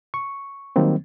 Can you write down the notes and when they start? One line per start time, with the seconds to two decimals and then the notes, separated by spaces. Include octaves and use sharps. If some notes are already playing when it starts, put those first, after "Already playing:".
0.14 C#6
0.76 D#3 F#3 G3 A#3 C4